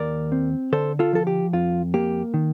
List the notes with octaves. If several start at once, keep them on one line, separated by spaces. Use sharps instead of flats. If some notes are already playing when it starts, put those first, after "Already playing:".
Already playing: D#2 A#4 D5
C4
D3 A4 C5
F4 A4
F3 A4
G4
F2 F4
A#3 G4
D#3